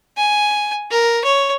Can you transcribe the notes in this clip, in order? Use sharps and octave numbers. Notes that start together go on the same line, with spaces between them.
G#5
A#4
C#5